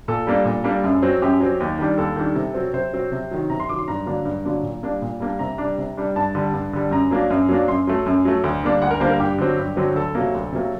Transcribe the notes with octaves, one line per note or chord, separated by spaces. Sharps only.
A#2 A4
G3 A#3 D4
A#2
G3 A#3 D4
F#2
F#3 C4
F#2 G4
F#3 C4
D#2
D#3 G3 D4
D#2 A4
D#3 G3 D4
C3
F#3 C4
C3 C5
F#3 C4
C3
D#3 F#3
C3 A#5
C6
D#3 F#3 D6
C6
G2 A#5
D3 F#3 A#3 D4
G2
D3 F#3 A#3 D4
A#2
G3 A#3 D4
A#2
G3 A#3 D4
C3 A#5
G3 D4
C3
G3 D4
G2 A5
D3 G3
G2
D3 G3
F#2 A#5
F#3 A#3 D4
F#2
F#3 A#3 D4
F#2 C6
F#3 A3
F#2
F#3 A3
D2
D3 G3 A#3 D4
D2 F#5
A#4
D3 G3 A#3 D4 C5
A#4
G2 G4
D3 F#3 C4
G2
D3 F#3 C4
D2 A4
C3 F#3 A#3
D2
C3 F#3 A#3